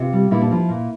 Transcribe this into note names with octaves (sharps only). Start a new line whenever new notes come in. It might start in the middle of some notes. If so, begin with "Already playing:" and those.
Already playing: C3 F4
G3
A#2 E4
D4
F3 E4
A#2